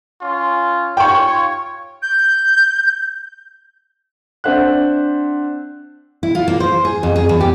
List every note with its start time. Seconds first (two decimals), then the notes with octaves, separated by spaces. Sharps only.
0.22 C#4 F4
0.97 F4 C#5 G5 C#6
2.02 G6
4.44 C4 D4 C5 E5 F#5 F#6
6.23 E4
6.35 F4
6.48 A#3
6.60 C5
6.85 G#4
7.03 F2
7.16 G#4
7.29 E2
7.40 G4